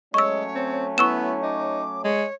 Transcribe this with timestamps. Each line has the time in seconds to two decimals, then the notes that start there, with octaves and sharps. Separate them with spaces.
0.14 F#3 G#3 A3 C#4 C#5 C#6 E6
0.55 C4
0.98 B3 E4 C#6 E6 E7
1.43 D#4 D6
2.04 G#3 C#5